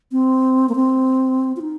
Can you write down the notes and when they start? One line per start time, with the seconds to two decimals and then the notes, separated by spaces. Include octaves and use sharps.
0.12 C4
0.69 A#3
0.75 C4
1.57 F4
1.62 D#4